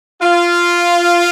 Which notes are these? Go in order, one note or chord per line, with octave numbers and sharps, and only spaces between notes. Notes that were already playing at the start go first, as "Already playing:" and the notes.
F4